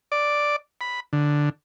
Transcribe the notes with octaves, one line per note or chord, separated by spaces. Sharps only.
D5
B5
D3